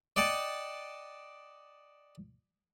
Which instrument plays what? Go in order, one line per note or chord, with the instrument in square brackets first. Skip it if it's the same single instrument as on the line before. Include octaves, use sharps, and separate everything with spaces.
[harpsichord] D5 D#5 F#5 G5 A5